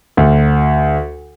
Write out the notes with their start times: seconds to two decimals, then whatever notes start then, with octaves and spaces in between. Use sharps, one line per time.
0.17 D2